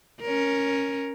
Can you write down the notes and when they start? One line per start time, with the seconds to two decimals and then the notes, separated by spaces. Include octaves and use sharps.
0.21 C#4 A#4